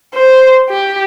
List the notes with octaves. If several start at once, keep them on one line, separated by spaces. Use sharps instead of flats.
C5
G4